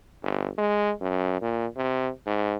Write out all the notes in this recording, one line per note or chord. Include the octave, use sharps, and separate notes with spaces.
G1
G#3
F#2
A#2
C3
G#2